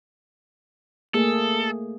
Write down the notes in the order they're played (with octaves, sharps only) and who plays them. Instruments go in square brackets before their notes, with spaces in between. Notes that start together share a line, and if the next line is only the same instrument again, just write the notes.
[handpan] A3 A#3 G#4 [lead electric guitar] A4